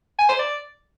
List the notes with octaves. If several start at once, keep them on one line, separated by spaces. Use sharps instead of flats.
G#5
C5
D5